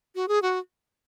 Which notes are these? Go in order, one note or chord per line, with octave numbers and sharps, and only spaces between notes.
F#4
G#4
F#4